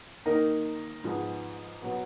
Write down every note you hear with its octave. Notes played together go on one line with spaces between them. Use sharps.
D#3 A#3 D#4 A#4
G#2 F3 G#3 B3
B2 F#3 B3